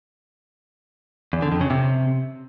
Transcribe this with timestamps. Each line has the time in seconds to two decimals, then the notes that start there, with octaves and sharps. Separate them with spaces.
1.33 E2
1.42 D3
1.52 F2
1.61 C#3
1.70 C3